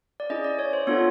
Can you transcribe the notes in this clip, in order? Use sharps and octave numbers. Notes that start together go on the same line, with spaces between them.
D5
C#4 E4 G#4 D#5
D5
C#5
C5
B3 D4 F4 A4 C#5